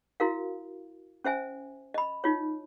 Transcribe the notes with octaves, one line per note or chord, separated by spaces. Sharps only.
E4 F#4 A#4 F5
C#4 C5 E5 G#5
D#5 B5
D#4 F4 C#5